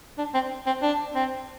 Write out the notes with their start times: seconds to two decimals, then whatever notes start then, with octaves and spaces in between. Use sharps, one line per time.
0.18 D4
0.34 C4
0.66 C4
0.82 D4
1.15 C4